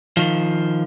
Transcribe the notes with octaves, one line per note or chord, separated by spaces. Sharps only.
D#3 F3